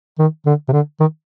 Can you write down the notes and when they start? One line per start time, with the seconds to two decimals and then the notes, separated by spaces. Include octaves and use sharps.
0.19 D#3
0.46 D3
0.68 C3
0.72 D3
1.00 D#3